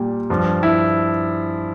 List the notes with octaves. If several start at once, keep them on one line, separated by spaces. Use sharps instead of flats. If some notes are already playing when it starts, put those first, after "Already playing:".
Already playing: A#2 G3
G2 F3
E4